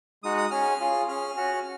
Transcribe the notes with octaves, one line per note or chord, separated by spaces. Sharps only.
G#3 D#4 F#4 D#6
D#6
C#4 G#4 F6
C#4 F4 G#4
C#4 G#4 F6
C#4 F#4